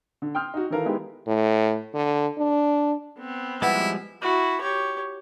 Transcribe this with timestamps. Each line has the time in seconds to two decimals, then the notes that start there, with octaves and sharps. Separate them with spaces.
0.22 D3
0.35 G5 C6 D#6 F6 G6
0.54 D#4 F#4
0.70 D#3 E3 A4 A#4 F5
0.85 G#3 B3 D#4 E4 G4 G#4
1.27 A2
1.94 D3
2.39 D4
3.19 B3 C4
3.62 F3 G3 G#3 E4 B4 F#5
4.22 E4 F#4
4.61 G4 C#5